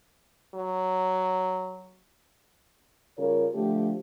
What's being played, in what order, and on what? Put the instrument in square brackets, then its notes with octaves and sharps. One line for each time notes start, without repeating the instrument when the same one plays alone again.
[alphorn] F#3
[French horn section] C#3 G3 F4 A#4 C#5
D3 F3 A3 G4